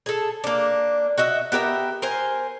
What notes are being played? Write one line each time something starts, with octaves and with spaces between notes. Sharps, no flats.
G#4 A4
A#3 D4
F#4 D#5 E5
B3 G4 A#4 E5
A#4 C5 G#5